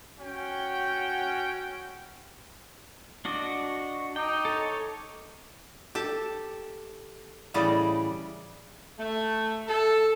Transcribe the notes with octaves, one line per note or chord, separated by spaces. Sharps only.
C#4 F#4 G5
D4 F#4 D#5 D6
C#6
D#4 G5 D6
A4 C#5
G4 A4 A5
A2 C#3 E3 G3 D5 D#5
A3
A4